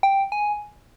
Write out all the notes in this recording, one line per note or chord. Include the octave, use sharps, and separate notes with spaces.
G5
G#5